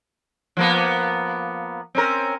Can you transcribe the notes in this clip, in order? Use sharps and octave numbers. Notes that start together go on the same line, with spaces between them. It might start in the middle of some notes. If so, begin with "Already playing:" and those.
F3 A#3 B3
C4 C#4 A#4